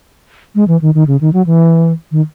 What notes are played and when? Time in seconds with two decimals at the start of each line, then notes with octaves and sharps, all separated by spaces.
0.55 G#3
0.68 E3
0.81 D#3
0.94 D#3
1.07 C#3
1.21 D#3
1.33 F#3
1.46 E3
2.11 D#3